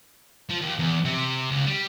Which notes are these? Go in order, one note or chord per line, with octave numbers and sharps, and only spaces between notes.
F3
D#2
E2
C3
C#2
G3